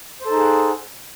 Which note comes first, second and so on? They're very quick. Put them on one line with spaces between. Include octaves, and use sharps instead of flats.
C5 A4 D#4 G#4 F#5